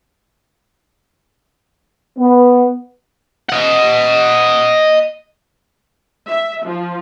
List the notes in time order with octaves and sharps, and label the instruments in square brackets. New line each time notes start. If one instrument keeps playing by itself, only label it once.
[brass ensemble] B3
[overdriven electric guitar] D#5 F#5
[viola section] E5
F3